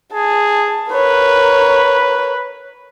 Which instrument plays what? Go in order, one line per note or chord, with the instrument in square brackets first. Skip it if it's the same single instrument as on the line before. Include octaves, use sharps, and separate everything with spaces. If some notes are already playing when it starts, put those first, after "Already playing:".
[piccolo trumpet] G#4 [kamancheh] A5
[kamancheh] A#4 C#5 [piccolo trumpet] B4